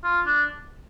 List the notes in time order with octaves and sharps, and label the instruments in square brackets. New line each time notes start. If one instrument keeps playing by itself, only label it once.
[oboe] F4
D4